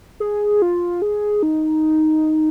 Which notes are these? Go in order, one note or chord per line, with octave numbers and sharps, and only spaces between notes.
G#4
F4
G#4
D#4